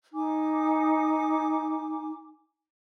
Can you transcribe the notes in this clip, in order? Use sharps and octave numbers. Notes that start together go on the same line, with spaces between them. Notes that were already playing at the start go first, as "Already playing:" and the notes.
D#4 G#5 D6